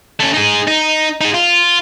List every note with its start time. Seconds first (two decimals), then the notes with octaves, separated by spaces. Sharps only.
0.20 A3 C#4
0.34 D#4 G#4
0.68 D#4
1.21 D#4 G#4
1.34 F4